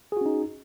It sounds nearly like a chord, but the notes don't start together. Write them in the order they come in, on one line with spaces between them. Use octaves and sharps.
G#4 F#4 C#4 D#4